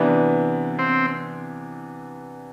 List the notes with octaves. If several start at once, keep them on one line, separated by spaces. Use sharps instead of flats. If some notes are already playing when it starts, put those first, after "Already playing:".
Already playing: C3 E3 B3 D4
C4